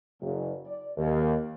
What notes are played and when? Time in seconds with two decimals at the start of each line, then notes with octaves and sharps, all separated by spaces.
0.21 F#1
0.65 D5
0.97 D#2